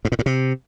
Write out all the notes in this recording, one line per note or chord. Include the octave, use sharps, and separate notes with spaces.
G#2
A#2
A2
C3